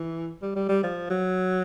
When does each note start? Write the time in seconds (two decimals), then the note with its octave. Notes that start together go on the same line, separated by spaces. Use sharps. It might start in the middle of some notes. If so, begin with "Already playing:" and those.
Already playing: E3
0.42 G3
0.56 G3
0.69 G3
0.83 F3
1.10 F#3